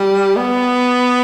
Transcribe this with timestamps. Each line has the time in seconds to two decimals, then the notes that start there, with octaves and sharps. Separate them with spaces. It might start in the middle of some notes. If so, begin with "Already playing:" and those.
Already playing: G3
0.36 B3